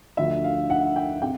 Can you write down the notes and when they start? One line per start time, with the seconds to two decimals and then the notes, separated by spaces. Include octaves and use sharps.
0.17 D2 D3 F3 E5
0.44 F5
0.70 F#5
0.96 G5
1.22 C3 G5